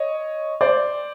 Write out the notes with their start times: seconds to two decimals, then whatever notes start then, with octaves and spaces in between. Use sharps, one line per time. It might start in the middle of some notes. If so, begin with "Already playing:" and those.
Already playing: C#5 D#5
0.61 C5 D5